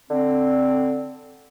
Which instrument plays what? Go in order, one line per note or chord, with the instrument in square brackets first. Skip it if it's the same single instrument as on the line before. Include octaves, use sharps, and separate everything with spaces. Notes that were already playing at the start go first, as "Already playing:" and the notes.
[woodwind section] D3 C4